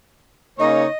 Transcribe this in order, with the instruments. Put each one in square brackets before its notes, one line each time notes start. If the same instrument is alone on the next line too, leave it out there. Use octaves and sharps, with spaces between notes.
[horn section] C#3 A#3 D#4 C#5 [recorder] D#5